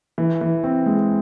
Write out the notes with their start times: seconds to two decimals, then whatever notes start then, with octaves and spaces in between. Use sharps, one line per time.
0.18 E3
0.41 E3
0.64 C4
0.86 G#3